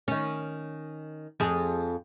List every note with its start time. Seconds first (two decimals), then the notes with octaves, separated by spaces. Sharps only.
0.08 D#3 C#4
1.40 F2 G#4